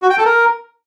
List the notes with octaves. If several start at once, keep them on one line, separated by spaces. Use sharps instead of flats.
F#4
G5
A4
A#4